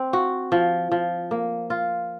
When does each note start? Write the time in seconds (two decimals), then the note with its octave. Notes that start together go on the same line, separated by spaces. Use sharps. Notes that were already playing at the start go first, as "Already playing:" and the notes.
Already playing: C4
0.13 F#4
0.52 F3
0.91 F3
1.31 A#3
1.70 F4